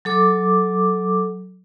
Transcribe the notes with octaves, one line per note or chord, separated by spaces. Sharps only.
F#3 A4 D6